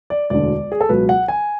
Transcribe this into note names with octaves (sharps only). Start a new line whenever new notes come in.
D5
E1 D2 D3 D5
G#4
A4
C#2 B2 F#3 B4
F#5
G#5